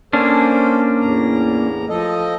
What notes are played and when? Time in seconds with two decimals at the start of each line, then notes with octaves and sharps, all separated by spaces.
0.13 A#3 C#4 D4 A4 C5
1.01 E2 A2 A#5
1.89 F3 A4 D#5